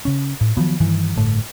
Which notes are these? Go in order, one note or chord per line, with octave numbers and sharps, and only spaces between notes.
C#3 C#4
A2
D#3 F3 F#3 B3
G2 D#3 E3
G1 A2 A3